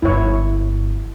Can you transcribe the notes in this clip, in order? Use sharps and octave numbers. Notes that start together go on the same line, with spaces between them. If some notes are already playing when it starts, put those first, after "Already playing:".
G1 G2 E4 C#5